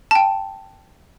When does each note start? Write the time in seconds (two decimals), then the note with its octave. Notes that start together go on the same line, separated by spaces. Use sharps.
0.11 G5 A5